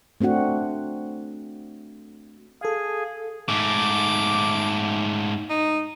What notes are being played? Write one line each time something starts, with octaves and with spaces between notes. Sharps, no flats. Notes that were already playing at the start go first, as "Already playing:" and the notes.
A3 C4 D4 F#4 F#5
G#4 A4 F5
G#2 A3 D6
D#4